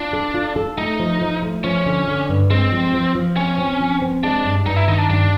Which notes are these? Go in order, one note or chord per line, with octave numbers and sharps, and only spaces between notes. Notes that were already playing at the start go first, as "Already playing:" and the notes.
Already playing: D4 F4
A4
F4
A4
A3 D#4
F3
F3
A3
F3 C#4
D3
D3
G2
G#3 C4
F3
F3
F3
C4 C#4
C4
F3
C4
G#3 D4
G2
G2 D#4
E4
D#3 D#4
D4
G2 D4